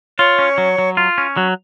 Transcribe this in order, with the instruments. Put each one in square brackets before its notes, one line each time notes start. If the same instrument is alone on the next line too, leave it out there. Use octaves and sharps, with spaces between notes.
[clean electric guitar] F4 [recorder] C#5
[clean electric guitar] C#4
F#3
F#3
F4
C#4
F#3